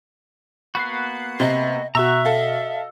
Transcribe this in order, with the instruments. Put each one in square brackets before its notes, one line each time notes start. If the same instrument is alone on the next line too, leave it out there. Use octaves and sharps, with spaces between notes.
[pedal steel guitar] A#3 B3 F#4 [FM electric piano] B5 F#6 C7
[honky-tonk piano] C3 [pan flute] D#5
[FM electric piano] B2 F#4 [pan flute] E5 [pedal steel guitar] A#5 C#6 F#6 [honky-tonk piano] E6
[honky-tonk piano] A4 F5 [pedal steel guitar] D#5